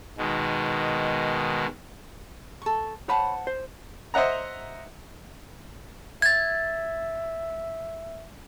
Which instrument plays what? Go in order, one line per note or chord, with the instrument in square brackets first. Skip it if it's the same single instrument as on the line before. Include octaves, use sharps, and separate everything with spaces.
[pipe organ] B2 D#3 G#3
[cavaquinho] A4 C#6
[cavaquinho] C5 F#5 A5 [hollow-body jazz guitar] C#5 B5
[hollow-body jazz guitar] C5
[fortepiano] C5 D#5 E5 F#5 A#5
[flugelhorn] E5 [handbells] G#6 A6